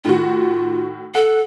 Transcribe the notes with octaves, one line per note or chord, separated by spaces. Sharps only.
A2 D#3 F4 F#4
A4 F#5